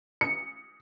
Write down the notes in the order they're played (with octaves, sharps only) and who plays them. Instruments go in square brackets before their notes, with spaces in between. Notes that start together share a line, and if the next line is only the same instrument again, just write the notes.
[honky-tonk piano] C#7